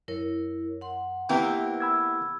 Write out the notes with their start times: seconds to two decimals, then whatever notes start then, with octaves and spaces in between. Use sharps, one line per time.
0.08 F#2 E4 A#4 C#5
0.81 F#5 C6
1.29 C3 E3 A#3 B3 G4 G5
1.80 B5 E6 G#6